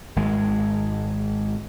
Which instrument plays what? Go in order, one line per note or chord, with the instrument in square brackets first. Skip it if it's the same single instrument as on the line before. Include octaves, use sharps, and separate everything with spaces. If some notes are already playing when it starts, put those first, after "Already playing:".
[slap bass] G#1 G#3